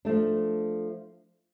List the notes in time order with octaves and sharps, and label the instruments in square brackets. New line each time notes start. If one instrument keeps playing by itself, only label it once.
[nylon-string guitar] F3 A3 D4